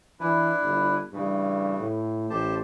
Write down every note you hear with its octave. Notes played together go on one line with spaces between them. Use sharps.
E3 D4 E4 B4
G1
G2 C#3 E3 A3
A2
A1 G4 C5 A5